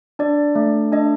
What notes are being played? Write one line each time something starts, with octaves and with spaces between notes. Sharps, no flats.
D4 D5
A3
D4 D#5